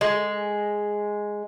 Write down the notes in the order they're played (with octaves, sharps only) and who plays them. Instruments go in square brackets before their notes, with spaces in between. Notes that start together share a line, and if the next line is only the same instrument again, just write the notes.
[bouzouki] G#3